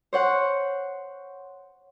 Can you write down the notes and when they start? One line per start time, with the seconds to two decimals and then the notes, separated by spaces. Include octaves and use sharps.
0.13 C5 C#5 F#5